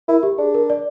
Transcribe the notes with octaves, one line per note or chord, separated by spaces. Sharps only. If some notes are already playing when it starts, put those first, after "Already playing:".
E4 A#4
G4
D4 G#4
A#4
D5